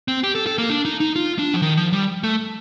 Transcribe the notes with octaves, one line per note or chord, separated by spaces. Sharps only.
C4
G4
A4
A4
A#3
D4
D#4
D#4
F4
D4
F3
D#3
F3
G3
A3